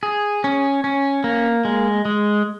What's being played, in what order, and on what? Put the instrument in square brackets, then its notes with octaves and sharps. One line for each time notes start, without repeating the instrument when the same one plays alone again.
[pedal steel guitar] G#4
C#4
C#4
A#3
G#3
G#3